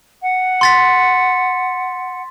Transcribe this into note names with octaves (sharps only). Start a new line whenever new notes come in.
F#5
C6 A6 B6